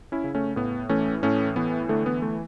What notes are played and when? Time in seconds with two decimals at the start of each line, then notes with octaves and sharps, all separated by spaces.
0.12 C#4 E4
0.24 C#3
0.35 A3 C#4
0.56 A2 B3
0.89 E3 A3 C#4
1.23 A2 A3 C#4
1.56 E3 B3
1.89 D3 A3
2.06 B3
2.22 A3